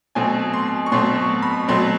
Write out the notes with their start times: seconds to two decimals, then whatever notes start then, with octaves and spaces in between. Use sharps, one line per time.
0.15 B2 F#3 A3 C4 G#5
0.53 C6
0.86 C#6
0.92 B2 F#3 A3 C4 C6
1.42 B5
1.68 B2 F#3 A3 C4 C6